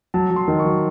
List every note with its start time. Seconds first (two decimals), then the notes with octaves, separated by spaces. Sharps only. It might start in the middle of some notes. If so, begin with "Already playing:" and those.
0.14 F#3 A5
0.30 F#3
0.36 C6
0.48 D#3
0.59 C#6
0.65 F#3